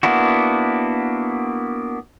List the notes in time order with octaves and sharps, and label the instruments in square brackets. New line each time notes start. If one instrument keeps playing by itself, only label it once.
[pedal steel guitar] A#3 B3 D4 E4 F#4